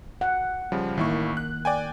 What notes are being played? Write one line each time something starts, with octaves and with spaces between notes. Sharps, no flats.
F#5
C#3 F3 G3
A1 D#3 A#3 E4 C#6
F#6
D5 G5 G#5